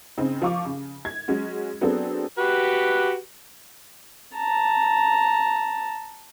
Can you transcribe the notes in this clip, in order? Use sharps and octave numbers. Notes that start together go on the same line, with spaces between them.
C#3 C4 D#4
F3 F5 C#6 D6
C#3
G#6
F#3 G#3 C#4 F#4
F#3 B3 C4 D4 G#4 A4
F#4 G4 B4
A5 A#5